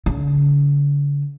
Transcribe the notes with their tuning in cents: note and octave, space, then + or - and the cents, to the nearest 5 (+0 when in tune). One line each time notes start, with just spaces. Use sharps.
D3 -45